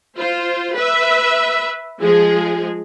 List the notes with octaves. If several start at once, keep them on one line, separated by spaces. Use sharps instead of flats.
F4 C5
B4 E5
F3 G#3 G#4